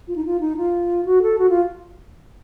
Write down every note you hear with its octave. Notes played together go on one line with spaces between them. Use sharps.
F4
D#4
F4
D#4
F4
F#4
A4
F#4
F4